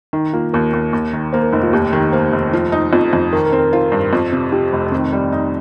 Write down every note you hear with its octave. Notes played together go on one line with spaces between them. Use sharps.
D#3 D#4
A#3 F4
D#2 A#4
D#2
D#2
D#3
A#3 C5
A#4
F1 D#4
F4
D#2 G4
D#3
A#3 C5
F1
F3
D#4
F2
F2
D#3 A#4
A#4
C4
A#4
F4 C5
G2
F2
C3
F3 G4
F1
D#3 C4
G3
D#4